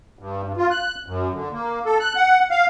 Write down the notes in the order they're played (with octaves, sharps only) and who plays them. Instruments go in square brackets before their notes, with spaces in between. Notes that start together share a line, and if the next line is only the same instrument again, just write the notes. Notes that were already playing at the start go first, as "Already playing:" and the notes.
[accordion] G2
G2
F4
F#6
F#2
D3
A#3
A4
F#6
F#5
F5